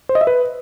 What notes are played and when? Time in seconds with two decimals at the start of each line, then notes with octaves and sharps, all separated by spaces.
0.09 C5
0.15 D#5
0.21 E5
0.27 B4